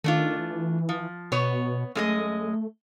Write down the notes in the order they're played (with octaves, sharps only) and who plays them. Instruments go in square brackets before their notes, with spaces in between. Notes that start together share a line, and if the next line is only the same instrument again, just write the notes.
[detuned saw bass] D#3 [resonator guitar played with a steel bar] A3 D4 F4
[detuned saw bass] E3
[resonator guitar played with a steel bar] F3
[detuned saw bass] B2 [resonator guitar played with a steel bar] B3 C#5
[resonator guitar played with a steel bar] F#2 G#3 D#5 [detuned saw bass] A3